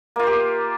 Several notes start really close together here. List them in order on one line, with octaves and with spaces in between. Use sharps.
A#3 F4 C5 G4